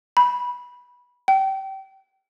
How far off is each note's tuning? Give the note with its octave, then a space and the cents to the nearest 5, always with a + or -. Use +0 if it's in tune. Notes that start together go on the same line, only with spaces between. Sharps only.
B5 -15
G5 -25